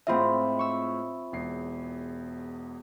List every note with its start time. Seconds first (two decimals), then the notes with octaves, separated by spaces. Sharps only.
0.07 A2 G#3 C4 F4 D#5 E5 B5
0.59 C#6 E6
1.32 E1 E2 C7